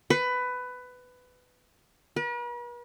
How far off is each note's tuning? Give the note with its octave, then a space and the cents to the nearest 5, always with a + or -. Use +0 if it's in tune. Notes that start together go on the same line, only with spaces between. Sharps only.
B4 +15
B4 -45